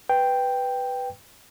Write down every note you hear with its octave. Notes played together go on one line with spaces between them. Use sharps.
B4 G5